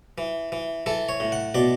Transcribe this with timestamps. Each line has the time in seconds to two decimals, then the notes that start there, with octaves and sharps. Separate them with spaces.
0.18 E3
0.52 E3
0.86 E3 A4
1.09 C#5
1.20 A2
1.32 F#5
1.54 B2 D5